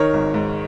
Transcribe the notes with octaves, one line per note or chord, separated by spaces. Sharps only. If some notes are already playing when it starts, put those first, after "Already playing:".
Already playing: D#3 A#4 C#5
G#1
G#2